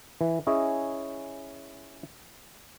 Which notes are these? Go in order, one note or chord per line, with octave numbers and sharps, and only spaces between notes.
E3
C#4 E4 G#4 C#5 D#5